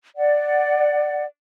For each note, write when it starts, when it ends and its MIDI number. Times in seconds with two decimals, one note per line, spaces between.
0.16 1.23 74
0.16 1.23 78